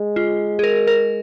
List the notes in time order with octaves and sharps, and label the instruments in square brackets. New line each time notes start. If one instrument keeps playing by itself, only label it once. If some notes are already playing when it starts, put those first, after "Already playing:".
Already playing: [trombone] G#3
[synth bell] F4
G#4
A#4
A#4